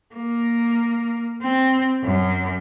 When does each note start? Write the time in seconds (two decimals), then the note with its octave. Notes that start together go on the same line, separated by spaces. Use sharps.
0.15 A#3
1.42 C4
2.04 F#2